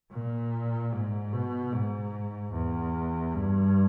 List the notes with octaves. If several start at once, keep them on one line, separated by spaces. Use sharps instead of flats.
A#2
G#2
B2
G#2
E2
G2